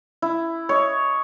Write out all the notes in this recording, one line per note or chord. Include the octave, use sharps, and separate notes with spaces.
E4
C#5 D#5